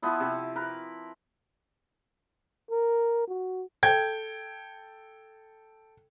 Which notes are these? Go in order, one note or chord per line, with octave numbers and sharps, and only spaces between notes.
F3 B3 E4
C3
A#4 B4
A#4
F#4
A4 G5 G#6